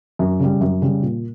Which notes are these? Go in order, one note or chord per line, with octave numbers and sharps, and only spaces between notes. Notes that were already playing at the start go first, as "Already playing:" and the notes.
F#2
C#3 G3
F#2
C#3 G3
A#2